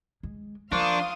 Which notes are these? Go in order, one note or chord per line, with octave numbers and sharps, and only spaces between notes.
G#3
F3 A#3 D4 C5 F5 C6 C#6 D#6